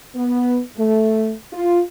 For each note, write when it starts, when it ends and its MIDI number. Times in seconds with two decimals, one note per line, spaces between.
0.16 0.60 59
0.78 1.32 57
1.53 1.81 65